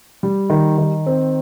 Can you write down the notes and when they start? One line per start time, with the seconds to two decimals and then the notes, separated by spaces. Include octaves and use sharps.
0.23 G3
0.50 D#3
0.78 D#3
1.06 C4